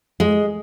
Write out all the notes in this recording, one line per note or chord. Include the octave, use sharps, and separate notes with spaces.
G#3